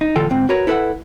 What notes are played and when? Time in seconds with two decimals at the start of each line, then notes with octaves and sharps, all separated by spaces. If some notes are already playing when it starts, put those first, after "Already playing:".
0.01 D#4
0.16 E2 A2 D3 F4 A4 G5
0.30 D2 G#2 C4
0.49 F#4 A#4 B4 C#5
0.67 E4 A4 B4 C5 E5 F#5